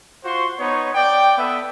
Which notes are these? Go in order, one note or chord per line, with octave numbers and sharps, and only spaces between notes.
F4 F#4 C5 C6 C#6
B3 D#4 B4 C#5 C#6
D5 G5
B3 A4 B4 E5